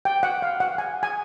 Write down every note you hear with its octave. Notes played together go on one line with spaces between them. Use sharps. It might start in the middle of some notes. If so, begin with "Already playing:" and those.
G5
F#5
F5
F#5
G#5
G#5